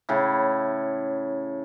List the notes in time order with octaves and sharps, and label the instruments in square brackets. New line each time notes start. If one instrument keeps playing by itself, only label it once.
[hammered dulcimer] A2 C#3